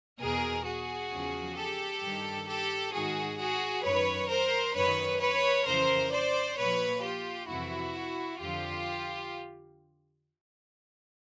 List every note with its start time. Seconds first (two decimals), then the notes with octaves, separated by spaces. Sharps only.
0.19 E2 B2 G#4 A#4
0.64 F#4 G#4
1.10 E2 C#3 F3
1.56 G4 A4
2.02 G2 D#3
2.47 G4 A4
2.92 G#2 D#3 F#4 G#4
3.38 F#4 G#4
3.83 F#2 D#3 B4 C#5
4.29 A#4 C5
4.74 F#2 D#3 B4 C#5
5.20 B4 C#5
5.66 F2 C#3 E3 A#4 C5
6.11 C5 D5
6.57 A#2 F3 B4 C#5
7.02 F4 G4
7.48 F2 C3 E3 E4 F#4
8.39 F2 D3 F3 F4 G4